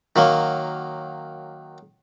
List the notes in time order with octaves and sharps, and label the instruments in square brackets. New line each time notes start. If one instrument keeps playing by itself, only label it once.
[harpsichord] D#3 F#3 A#3